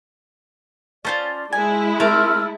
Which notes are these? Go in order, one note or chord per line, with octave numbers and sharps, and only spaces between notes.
C#4 D#4 F4 A4 C5 D5
G#3 E4 G#5
A3 C4 A#4 E6 F6